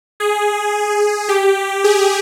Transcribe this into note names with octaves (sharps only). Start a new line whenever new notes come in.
G#4
G4
G#4